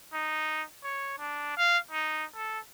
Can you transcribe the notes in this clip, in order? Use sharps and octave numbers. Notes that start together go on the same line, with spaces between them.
D#4
C#5
D4
F5
D#4
A4